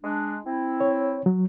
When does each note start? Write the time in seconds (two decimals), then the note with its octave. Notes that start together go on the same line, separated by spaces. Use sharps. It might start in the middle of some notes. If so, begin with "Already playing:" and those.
0.03 G#3 D4
0.45 C4 E4
0.80 C#5
1.26 F#3